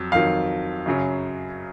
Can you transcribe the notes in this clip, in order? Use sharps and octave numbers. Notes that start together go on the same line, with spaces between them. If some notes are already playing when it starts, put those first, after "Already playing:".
Already playing: F2 F#3
F2 D#3 F#3 F5
F#2 C#3 F#3